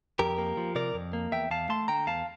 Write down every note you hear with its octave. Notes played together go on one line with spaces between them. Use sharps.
F2 G4 A#4
A#3
F3
C3 A#4 D5
F2
A#3
E2 E5 G5
E2 F5 A5
A3 A5 C6
D3 G5 A#5
E2 F5 A5